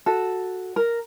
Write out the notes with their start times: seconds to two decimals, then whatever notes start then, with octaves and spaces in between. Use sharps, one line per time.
0.06 F#4 A4
0.76 A#4